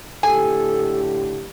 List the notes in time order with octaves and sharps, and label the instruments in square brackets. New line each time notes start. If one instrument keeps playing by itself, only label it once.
[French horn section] A2 D3 G4 [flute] A4 [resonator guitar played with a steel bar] G#5